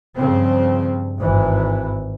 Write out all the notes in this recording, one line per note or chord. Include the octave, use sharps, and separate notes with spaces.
G2 C#3 F3 C4
G#1 E3